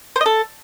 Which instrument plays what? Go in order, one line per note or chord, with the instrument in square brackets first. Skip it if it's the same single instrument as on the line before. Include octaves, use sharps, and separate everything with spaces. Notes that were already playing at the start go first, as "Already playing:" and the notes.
[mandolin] C5
D#5
A4